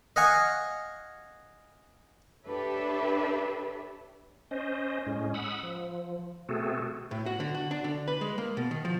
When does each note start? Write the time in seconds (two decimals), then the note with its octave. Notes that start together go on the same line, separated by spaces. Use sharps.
0.16 D#5 F5 F#5 G#5 C#6
2.46 D4 G4 A4 B4 C#5 E5
4.51 C#4 C5 D#5
5.07 A2 G#3 C#4
5.34 F#5 B5 D#6 E6
5.63 F3
6.49 B2 A3 C4 F#4 G#4 A4
7.11 A2
7.26 F#4
7.40 D3
7.54 F#4
7.71 D4
7.84 D3
8.08 B4
8.21 G#3
8.38 A#3
8.57 B2
8.71 D#3
8.85 F3